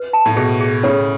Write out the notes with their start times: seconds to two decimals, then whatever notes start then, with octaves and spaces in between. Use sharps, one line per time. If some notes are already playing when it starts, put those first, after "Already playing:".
Already playing: B4
0.13 A5
0.26 A2
0.36 B2 G#4
0.61 G#4
0.83 A2 C#3 C#5